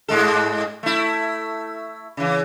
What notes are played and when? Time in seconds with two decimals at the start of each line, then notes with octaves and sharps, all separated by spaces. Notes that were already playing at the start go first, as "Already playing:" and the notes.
0.08 G#2 G#3 A4
0.83 A3 E4
2.17 C#3 E3